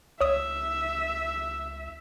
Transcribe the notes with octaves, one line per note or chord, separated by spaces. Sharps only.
C#2 C#5 E5 D#6